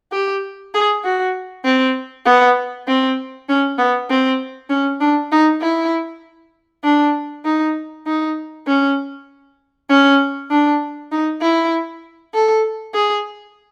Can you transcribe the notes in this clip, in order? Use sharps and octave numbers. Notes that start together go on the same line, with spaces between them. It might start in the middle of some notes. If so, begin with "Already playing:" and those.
G4
G#4
F#4
C4
B3
C4
C#4
B3
C4
C#4
D4
D#4
E4
D4
D#4
D#4
C#4
C#4
D4
D#4
E4
A4
G#4